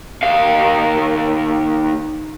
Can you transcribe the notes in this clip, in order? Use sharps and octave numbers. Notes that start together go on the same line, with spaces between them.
D#2 F5